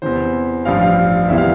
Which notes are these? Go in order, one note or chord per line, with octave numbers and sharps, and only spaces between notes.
E2 C3 E3 C5
A1 G2 F3 F5
F5
F1 E2 C3 E3 G3 E5
F5